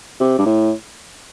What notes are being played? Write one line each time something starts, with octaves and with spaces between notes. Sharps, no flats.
C3
G2
A2